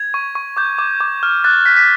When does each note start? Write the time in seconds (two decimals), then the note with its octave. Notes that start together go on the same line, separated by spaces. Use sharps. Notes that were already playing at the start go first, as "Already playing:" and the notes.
Already playing: G#6
0.14 C#6
0.35 C#6
0.57 D6 G6
0.78 D6
1.00 D6
1.23 F6
1.44 F#6 A6
1.66 F#6 B6
1.76 B6